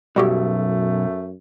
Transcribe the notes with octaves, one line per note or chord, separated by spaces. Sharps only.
B1 F#2 G3 A3 F#4 G4